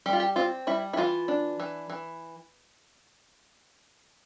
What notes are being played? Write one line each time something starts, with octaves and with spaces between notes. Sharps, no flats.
G3 G4
F4
G4
C4 F4
G3 E4
E4
E3 F4
D4
E3
E3